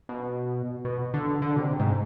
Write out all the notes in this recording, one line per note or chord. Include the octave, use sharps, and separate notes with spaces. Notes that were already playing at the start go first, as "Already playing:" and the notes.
B2
B2
D3
D3
B2
C3
G#2